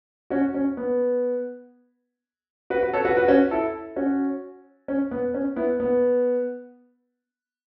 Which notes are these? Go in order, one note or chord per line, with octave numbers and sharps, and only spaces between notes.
C#4 F#4
C#4
B3
F#4 B4
F#4 B4
A4 C#5
F#4 B4
F#4 B4
C#4 F#4
E4 A4
C#4 F#4
C#4
B3
C#4
B3 E4
B3